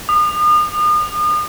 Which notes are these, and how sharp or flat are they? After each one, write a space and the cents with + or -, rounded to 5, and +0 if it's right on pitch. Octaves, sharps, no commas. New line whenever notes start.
D#6 -40